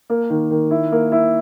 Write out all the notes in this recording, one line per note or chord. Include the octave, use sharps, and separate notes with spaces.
A#3
D#3
D#3
E4
A#3
E4